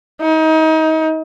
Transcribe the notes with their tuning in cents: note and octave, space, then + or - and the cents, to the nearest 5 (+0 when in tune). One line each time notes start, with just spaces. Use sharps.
D#4 +30